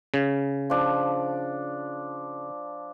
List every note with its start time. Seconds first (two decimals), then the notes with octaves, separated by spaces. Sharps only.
0.14 C#3
0.70 F3 D4